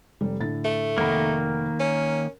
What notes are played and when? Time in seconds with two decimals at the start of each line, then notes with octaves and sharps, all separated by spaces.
0.21 F1 G3
0.40 A2 D3 A6
0.64 A3
0.98 F1 D#3 A#3 F#5 B5
1.80 C#4 A#4